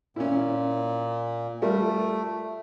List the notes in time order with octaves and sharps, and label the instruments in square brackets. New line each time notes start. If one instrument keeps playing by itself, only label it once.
[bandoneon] A#2 [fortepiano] C#4 E4
[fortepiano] G3 F4 A#4 [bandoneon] A3